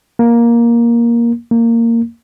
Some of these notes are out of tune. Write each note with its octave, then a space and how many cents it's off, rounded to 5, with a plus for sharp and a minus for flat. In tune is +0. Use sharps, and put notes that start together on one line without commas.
A#3 +10
A#3 -15